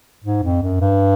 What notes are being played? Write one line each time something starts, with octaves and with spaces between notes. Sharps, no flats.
G#2
F2
F#2
G2